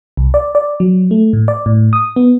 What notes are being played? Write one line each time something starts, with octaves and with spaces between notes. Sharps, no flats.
C2
D5
D5
F#3
A3
A2
D5
A2
D#6
B3